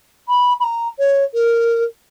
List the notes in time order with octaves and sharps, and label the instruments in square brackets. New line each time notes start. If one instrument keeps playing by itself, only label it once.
[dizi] B5
B5
A#5
C#5
A#4